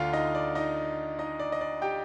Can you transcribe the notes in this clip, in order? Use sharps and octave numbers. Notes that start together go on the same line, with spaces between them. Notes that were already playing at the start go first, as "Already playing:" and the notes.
Already playing: D2 D3 F4 F5
D#4 D#5
D5
D#4 D#5
D#4 D#5
D5
D#5
D5
G4 G5